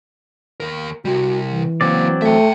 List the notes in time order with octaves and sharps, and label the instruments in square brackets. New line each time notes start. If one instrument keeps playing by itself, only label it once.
[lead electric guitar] D#2 A#4
[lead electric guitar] C3 G3 [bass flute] F#4
[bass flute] E3
[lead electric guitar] C#3 A#3 [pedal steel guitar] F#3 C4 D5
[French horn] A3 [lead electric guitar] E5 G5